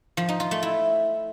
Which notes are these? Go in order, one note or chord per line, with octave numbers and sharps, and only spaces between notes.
F3
D#4
F4
A3
E4